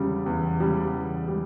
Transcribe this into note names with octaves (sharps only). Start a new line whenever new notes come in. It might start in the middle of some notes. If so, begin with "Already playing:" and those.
Already playing: E2 C#3 G3
E2
C#3 G3
E2
G3